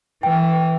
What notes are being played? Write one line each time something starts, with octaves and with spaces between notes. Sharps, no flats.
E3 G5